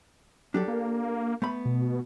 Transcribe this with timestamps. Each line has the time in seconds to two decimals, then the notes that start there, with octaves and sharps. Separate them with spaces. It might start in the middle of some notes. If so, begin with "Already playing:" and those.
0.54 F#3 D4 G4 A4
0.68 A#3
1.42 A3 B3 B5
1.65 B2